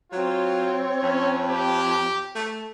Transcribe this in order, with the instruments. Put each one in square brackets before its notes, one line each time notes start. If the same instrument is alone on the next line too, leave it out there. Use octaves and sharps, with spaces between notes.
[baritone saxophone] F#3 [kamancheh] C4 C#5 [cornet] F4
[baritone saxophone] F2 [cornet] C#4
[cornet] G4
[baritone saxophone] A3